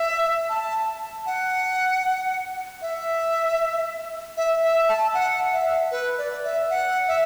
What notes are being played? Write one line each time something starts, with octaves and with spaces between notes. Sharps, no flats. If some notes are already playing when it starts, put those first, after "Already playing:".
Already playing: E5
A5
A5
F#5
E5
E5
E5
A5
F#5
E5
B4
D5
E5
F#5
E5